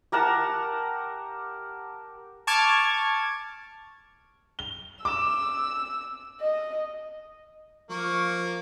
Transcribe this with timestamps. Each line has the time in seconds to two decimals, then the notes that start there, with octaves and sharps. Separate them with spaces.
0.12 G4 A#4 F#5 A5
2.47 A5 C#6 D6 F6 G#6
4.59 G7
5.05 D6 E6 E7
6.41 D#5
7.90 F3 A#3 C#6